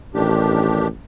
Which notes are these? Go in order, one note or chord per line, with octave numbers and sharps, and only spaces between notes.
A1 D#3 D4 G4